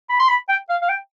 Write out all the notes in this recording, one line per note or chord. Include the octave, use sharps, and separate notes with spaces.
B5
C6
B5
G5
F5
F5
G5